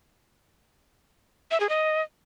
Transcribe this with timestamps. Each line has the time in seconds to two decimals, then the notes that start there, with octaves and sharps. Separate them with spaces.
1.51 E5
1.60 G#4
1.69 D#5